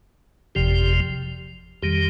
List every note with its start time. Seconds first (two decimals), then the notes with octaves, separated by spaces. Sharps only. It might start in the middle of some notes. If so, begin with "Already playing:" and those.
0.55 G1 F2 C3 F3 G4
1.82 F2 D#3 G3 G4